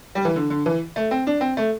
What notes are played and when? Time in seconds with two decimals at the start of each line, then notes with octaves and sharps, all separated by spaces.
0.15 G3
0.25 E3
0.36 D3
0.50 D3
0.66 E3
0.96 A3
1.11 C4
1.27 D4
1.41 C4
1.57 A3